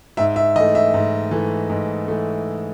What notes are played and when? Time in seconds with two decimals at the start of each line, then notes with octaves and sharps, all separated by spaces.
0.17 G#2 E5
0.36 E5
0.56 E3 D#5
0.60 A3
0.75 E5
0.94 G#2
1.31 E3 A3
1.70 G#2
2.08 E3 A3